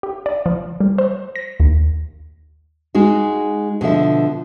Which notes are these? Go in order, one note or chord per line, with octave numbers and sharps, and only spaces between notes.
G4
D5
F3
G3
C5
A#6
D#2
G#3 D#4 F#4
B2 D3 F3 E5